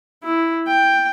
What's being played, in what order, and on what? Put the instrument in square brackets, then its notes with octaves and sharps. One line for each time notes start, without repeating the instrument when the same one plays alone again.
[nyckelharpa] E4
G5